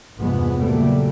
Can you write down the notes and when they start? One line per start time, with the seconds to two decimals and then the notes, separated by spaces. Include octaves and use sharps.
0.20 E2 G2 C3 F3 G#3 B3
0.56 A#2 C#3 F#3 G3 A3 A#3